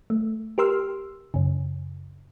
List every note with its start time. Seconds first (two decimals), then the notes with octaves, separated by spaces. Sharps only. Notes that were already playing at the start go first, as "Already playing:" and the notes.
0.10 A3
0.58 G4 A#4 C6 E6 F6
1.34 F#2 C#3